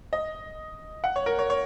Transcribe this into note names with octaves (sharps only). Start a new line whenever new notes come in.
D#5
F#5
C#5
A#4
C#5
C#5